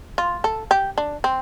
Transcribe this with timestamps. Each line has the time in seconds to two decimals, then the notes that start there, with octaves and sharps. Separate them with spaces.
0.18 F4
0.44 A4
0.71 G4
0.98 D4
1.24 C4